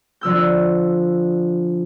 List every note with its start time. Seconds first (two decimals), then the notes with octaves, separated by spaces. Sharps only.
0.21 D3 F3 E6 G6